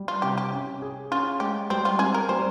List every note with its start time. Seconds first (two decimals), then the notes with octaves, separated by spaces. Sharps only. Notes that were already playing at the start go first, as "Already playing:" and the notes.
Already playing: G3
0.08 F4
0.22 C3 G4
0.37 G4
0.52 C#4
0.82 G#4
1.11 C#4 F4
1.40 G#3 G4
1.70 G3 C4
1.85 F4
1.99 C4 G#4
2.14 A#4
2.29 G3 C5